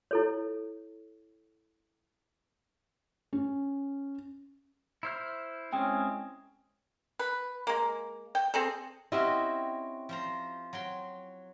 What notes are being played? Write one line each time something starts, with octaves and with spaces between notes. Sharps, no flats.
E4 A4 C#5
C#4
E4 C5 F6
G#3 C4 C#4 E4 G5
B4
G#3 A#3
G5
C4 G#4 A4
C4 C#4 E4 F#4 G4 D#5
F3 C5 A#5
F#3 G5 C6